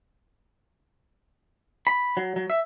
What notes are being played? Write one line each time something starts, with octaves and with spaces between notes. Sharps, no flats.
B5
F#3
F#3
E5